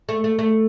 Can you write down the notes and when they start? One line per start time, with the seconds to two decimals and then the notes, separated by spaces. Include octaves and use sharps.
0.09 A3
0.24 A3
0.39 A3